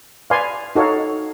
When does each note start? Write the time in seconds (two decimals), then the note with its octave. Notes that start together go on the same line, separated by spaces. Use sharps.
0.30 B4 D5 F5 G#5 C6
0.75 D#4 F#4 A4 C#5 F5